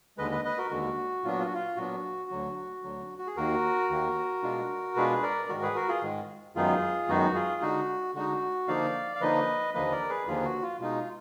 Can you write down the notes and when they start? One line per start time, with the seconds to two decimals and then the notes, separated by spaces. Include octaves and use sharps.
0.17 D#2 D3 G#3 B4 D#5
0.31 B4 D#5
0.45 B4 D#5
0.58 F#4 A#4
0.71 D#2 D3 G#3 F#4
1.24 A#2 F#3 B3 D4 F4
1.32 F#4
1.39 F4
1.46 F#4
1.54 F4
1.77 A#2 F#3 B3 D4 F#4
2.30 D2 D3 F#3
2.83 D2 D3 F#3
3.18 F#4
3.27 G#4
3.37 D#2 D#3 A#3 F#4 A#4
3.90 D#2 D#3 A#3
4.43 B2 G#3 D4 F4
4.96 B2 G#3 D4 F4 G#4 B4
5.23 A#4 D5
5.49 G#2 D#3 G#3 F#4 A#4
5.62 G#4 B4
5.76 F#4 A#4
5.89 F4 G#4
6.03 G#2 D#3 G#3
6.56 F#2 D#3 G#3 B3 D#4 F4 G#4
7.09 F#2 D#3 G#3 B3 D#4 F#4
7.35 F4 G#4
7.62 D3 G#3 D#4 F#4
8.15 D3 G#3 D#4 F#4
8.68 D3 F3 A#3 D#4 D5 F5
9.16 F5
9.21 D3 F3 A#3 D#4 B4 D#5
9.74 D#2 D3 F3 A#3 B4 D#5
9.92 A#4 D5
10.09 G#4 B4
10.27 D#2 D3 F3 A#3 F4 G#4
10.45 F#4
10.63 F4
10.80 B2 G#3 D#4 F4